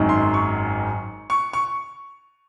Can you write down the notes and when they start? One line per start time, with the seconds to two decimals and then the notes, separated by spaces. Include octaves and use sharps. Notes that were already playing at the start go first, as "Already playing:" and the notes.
Already playing: G#1 F#2 D#3 F#3
0.09 C6
0.34 C#6
1.30 C#6
1.53 C#6